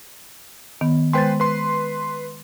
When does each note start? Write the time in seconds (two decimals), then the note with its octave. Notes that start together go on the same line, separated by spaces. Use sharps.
0.81 D#3 B3
1.13 G#3 B4 C5 G5 C6 A6
1.40 B4 C6